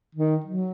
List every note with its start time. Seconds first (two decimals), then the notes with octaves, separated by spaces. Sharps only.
0.15 D#3
0.45 F#3